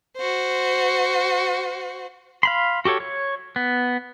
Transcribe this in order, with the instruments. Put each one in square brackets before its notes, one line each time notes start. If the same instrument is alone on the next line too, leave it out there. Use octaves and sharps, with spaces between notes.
[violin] F#4 C5
[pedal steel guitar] F5 B5 C6
F#4 G4 A4 C#5
C#5
B3